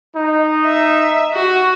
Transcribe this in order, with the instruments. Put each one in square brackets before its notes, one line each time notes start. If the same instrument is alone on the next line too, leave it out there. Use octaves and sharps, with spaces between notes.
[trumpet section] D#4
[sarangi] E5
F#4